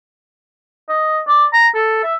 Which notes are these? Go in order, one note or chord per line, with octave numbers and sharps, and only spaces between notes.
D#5
D5
A#5
A4
E5